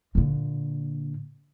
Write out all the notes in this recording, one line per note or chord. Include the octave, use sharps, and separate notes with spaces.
A#2 D3